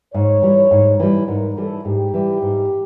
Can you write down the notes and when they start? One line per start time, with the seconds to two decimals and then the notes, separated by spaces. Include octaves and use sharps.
0.13 G#2 C#5
0.42 E3 G3
0.71 G#2
1.00 E3 G3
1.28 G#2 A#4
1.57 E3 G3 A4
1.85 G#2 G4
2.14 E3 G3
2.42 G#2